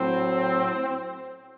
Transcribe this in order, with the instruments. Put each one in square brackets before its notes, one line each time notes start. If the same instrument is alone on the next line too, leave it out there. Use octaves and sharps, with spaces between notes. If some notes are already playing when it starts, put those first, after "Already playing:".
Already playing: [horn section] A2 F#3 C4